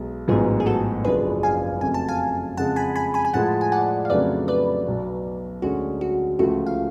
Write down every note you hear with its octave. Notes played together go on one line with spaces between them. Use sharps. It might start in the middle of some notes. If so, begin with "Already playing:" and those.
Already playing: B1 B2 G#3
A1 G#2 F#3 B3 F4 G#4
G#4
F#4 A4
F#1 F#2 F3 G#3 D4 G#4 B4
F5 G#5
F2 C#3 F#3 A3 G#5
A5
F5 G#5
F2 C#3 G#3 F#5 A5
G#5 B5
G#5 B5
G#5 B5
G#5
A2 F3 G#3 F#5 A5
G#5
D5 F#5
F5
F2 C#3 F#3 A3 D4 B4 D5
B4 D5
B1 B2 F#3
D2 D3 G#3 C#4 F#4
F#4
C#2 C#3 F3 A3 F#4
F5